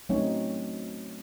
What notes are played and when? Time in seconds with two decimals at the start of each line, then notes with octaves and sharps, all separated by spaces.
0.09 F#3 A3 C4 C#4 D#4 C#5